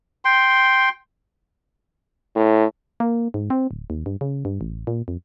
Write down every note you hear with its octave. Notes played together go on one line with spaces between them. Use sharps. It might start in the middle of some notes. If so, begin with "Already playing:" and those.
G5 C6
A2
A#3
G#2
C4
D1
D#2
G2
C#3
G2
A1
A#2
F2